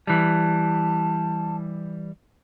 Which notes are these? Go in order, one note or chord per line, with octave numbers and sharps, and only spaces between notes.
E3 G3 A5